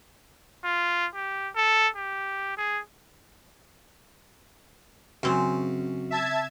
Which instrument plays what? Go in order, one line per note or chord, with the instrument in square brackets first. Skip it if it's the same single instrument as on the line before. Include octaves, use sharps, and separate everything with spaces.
[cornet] F4
G4
A4
G4
G#4
[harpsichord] F#2 [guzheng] C#3 C4 C#4
[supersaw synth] E5 A5 G#6